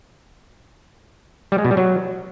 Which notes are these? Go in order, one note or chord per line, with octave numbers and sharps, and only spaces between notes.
G3
G#3
B2
G3
F#3